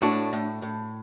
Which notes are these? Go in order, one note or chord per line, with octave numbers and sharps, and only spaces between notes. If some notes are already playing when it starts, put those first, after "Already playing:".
A2 D4 F#4
A2
A2